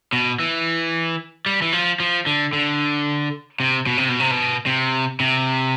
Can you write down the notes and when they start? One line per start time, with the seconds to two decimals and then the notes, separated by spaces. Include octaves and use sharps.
0.13 B2
0.40 E3
1.46 G3
1.62 E3
1.73 F3
2.00 F3
2.26 D3
2.53 D3
3.60 C3
3.87 B2
3.97 C3
4.09 B2
4.20 C3
4.31 B2
4.66 C3
5.20 C3